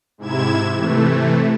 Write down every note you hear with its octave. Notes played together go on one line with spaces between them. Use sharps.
G#2 C3 E4 G#6 E7
C3 E3 A3